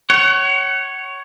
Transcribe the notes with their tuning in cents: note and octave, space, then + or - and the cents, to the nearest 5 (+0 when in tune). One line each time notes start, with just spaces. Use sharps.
C#5 +0 F#5 +30